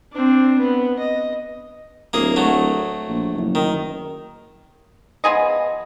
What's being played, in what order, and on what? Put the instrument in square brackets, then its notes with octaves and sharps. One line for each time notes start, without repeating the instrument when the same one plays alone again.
[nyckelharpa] C4 D4
B3
D#5
[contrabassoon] D1 [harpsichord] A#3 G#4
[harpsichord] F#3 A3
[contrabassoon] A#1
F#1
[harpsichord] D#3
[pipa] F3 B3 G#4 D#5